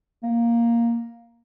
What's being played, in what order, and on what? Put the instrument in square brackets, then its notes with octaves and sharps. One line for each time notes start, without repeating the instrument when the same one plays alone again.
[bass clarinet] A#3